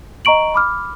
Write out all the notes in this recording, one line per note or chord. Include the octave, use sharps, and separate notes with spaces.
D#5 A#5 C#6 D7 F#7
B5 D6 F6